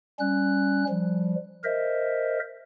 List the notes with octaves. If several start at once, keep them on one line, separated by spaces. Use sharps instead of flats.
G3 C#4 F#6
F3 G3
A#4 C5 D#5 E5